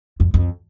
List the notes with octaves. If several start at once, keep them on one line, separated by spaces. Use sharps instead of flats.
F2
F2